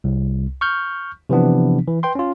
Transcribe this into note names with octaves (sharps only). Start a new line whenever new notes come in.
C2
C#6 F6 G6
C3 E3 F3 B3 D4
E3
B4 G5 C6
C#4 F4